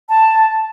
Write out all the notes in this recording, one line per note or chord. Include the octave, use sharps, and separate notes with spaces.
A5